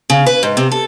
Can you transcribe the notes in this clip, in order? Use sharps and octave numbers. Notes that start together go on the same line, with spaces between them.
C#3
B4
G#2
C3
A4